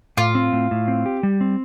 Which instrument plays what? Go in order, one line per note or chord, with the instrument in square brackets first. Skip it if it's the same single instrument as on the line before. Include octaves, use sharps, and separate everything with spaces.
[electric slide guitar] A2 [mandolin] F4
[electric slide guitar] C4
A2
A2
C4
G4
G3
C4